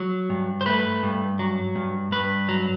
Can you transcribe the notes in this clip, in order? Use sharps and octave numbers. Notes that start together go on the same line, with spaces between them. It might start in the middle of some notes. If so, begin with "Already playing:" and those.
Already playing: F#3
G2
C5
A3 B4
G2
F#3
G2
G2 B4
F#3